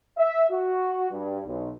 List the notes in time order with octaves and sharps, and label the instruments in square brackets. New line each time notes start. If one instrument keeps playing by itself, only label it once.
[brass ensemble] E5
F#4
G2
B1